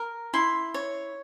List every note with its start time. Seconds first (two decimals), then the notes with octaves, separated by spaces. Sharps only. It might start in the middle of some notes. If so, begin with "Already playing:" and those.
Already playing: A#4
0.34 E4 C6
0.74 C#5